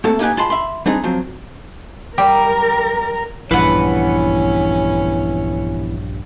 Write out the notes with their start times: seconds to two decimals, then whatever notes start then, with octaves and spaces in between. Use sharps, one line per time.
0.04 A3 A#3 C4 F#4 A4
0.19 A#3 D#4 G4 B4 G#5
0.37 G#3 F4 A5 B5 C6
0.50 E5 B5 C6
0.86 G3 C4 D4 D#4 G#4
1.04 F3 F#3 C4
2.18 G3 G4 A#4
3.51 A#1 G2 E3 B3 C#4 B4 F#5